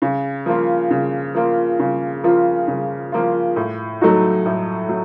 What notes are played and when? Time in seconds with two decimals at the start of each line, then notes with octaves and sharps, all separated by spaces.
0.02 C#3
0.46 F3 A#3 F4
0.91 C#3
1.35 F3 A#3 F4
1.79 C#3
2.23 F3 A#3 F4
2.68 C#3
3.12 F3 A#3 F4
3.56 A2
4.01 F#3 A3 D#4 F#4
4.46 A2
4.89 F#3